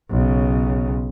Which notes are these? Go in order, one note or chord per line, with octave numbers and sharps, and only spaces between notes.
B1 C#3